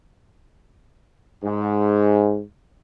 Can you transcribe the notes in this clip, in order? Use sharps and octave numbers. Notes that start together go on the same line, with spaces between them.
G#2